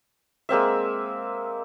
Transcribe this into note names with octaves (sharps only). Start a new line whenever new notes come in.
G#3 A#3 C4 E5